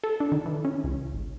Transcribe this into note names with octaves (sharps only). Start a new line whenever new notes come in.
A4
D4
D#3
E3
C#4
C#2
G#1